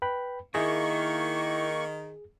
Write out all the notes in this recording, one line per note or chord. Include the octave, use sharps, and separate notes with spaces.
B4 G5 B5
D#3 A#3 E4 G#4 C#6